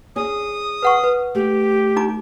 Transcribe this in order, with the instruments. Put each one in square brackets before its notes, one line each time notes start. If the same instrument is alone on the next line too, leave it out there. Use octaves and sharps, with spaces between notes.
[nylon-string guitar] C#4 G#4 [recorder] D#6
[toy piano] B4 F#5 C#6
B4
[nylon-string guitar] A3 [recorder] G4
[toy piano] D#4 A#5 D6